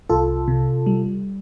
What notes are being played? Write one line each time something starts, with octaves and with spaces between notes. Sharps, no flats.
C2 F4 A4
C3
G3